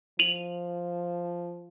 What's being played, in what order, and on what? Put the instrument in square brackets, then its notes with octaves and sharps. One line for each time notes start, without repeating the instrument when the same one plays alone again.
[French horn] F3 [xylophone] D#7 F7 F#7